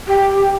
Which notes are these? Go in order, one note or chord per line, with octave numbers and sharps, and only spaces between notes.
G4